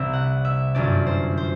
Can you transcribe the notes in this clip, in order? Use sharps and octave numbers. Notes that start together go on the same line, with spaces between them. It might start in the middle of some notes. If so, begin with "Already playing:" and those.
Already playing: C2 C3 C4 E5
F#5
E5
G1 F#2 F#3 D5
C5
C5